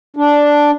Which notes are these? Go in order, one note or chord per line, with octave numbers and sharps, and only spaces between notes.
D4